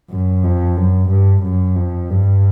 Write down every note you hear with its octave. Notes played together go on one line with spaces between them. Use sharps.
F#2
F2
F#2
G2
F#2
F2
G2